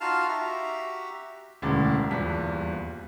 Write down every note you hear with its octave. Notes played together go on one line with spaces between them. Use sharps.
D#4 F4 F#4 F5 A5 F6
F#4 G4 E5 A#5
E1 D2 C#3 D6 A6
D#1 E2 G2 B6